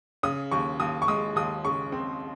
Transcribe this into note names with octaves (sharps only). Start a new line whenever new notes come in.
C#3 D#6
D#2 C#6
D#2 D#6
C#6
G#3 D#6
D#2 D#6
C#3 C#6
C4